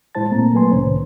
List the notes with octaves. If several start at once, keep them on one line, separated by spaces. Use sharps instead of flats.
A2 G#3 E4 C5 A5 A6
A#2 A3 A#3 C4 A#5
F#3 A3 A#3 B4 G#5 C6
C2 A2 C3 D#3 C#4 C5